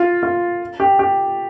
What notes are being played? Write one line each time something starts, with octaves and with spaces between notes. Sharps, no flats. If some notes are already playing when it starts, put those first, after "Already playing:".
Already playing: F4
F4
G4
G4